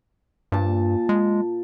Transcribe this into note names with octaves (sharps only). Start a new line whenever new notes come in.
G2 A#2 A5
G#3